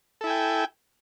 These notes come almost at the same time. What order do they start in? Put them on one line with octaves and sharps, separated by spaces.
A4 E4 G#5 G5